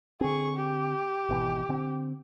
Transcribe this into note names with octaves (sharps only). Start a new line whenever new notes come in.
D3 C4 G#4 C#6
G4
G#1 B2 E3
D3 C4